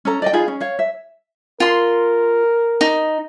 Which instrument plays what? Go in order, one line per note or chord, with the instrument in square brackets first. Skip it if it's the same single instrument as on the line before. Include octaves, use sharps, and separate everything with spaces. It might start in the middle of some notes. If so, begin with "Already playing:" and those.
[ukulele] C#4 A4 A#5
D5 D#5 G5
D#4 F4 G#4 B5
C#4
C#5 F5
E5
[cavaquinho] F4 C6 [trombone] A#4
[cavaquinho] D#4